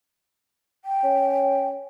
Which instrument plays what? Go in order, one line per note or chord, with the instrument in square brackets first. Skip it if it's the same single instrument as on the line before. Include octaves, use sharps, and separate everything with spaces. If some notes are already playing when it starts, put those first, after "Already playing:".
[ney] G5
[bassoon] C#4